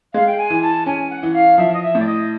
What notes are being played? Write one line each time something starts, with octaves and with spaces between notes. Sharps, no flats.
G#3 F5
G5
G#5
E3
A5
C#4 G#5
F#5
E3
F5
F3 E5
D#5
E5
A2
D5
D#5